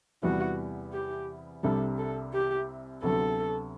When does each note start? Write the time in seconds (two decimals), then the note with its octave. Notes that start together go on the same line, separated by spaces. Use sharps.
0.23 E2 C3 G3 B3 E4 F#4
0.93 G4
1.63 C2 C3 G3 D4 A4
1.98 A4
2.33 G4
3.03 D2 C3 F#3 B3 A4